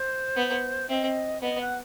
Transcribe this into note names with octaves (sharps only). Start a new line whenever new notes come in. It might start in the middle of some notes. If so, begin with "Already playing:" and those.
Already playing: C5
B3
C4 D#5 E5
B3 D#5
F#5